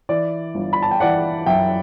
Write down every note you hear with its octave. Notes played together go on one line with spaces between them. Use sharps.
E3 D5
G1
B5
A5
G5
E3 D5 F#5
F#2 E5 G5